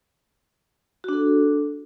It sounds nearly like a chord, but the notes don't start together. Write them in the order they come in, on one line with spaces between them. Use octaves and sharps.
F#4 D4 A4